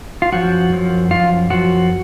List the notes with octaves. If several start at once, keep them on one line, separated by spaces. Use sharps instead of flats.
F4
F#2 F3 F#4
F#2 F3
F#2 F3 F4
F#2 F3 F#4